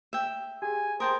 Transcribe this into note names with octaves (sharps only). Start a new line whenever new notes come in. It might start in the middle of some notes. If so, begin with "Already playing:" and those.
E5 G5
G4 G#4 G#5
A#4 C5 G5 A5 D#6 G6